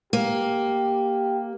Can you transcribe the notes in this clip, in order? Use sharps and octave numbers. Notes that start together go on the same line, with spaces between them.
A#3 G4